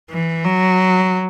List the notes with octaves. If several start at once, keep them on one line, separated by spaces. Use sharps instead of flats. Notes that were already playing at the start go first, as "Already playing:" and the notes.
E3
F#3